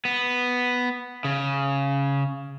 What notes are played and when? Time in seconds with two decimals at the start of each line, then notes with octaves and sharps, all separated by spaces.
0.05 B3
1.25 C#3